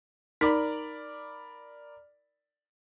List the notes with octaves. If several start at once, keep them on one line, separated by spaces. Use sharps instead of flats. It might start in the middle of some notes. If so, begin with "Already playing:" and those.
D#4 A#4 D5 B5